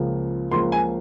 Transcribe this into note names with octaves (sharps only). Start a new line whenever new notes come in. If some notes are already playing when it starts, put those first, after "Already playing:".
Already playing: C#2 C#3 F3 A#3
C#2 C#3 F3 A#3 C6
G#5